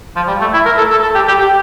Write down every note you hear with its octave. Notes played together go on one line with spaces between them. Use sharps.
F3
G3
A3
E4
A#4
A4
A4
A4
G4
G4
G4